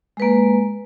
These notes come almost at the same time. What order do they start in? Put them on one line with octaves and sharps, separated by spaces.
G#3 B4 A#3